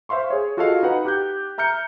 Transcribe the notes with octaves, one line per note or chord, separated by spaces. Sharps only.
C5 E5 F5 C6 C#6
G#4 C#5
F4 F#4 G#4 A4 D#5 F5
D#4 B4 F#5
G4 F#6 G6
E5 A#5 F6 G6 C#7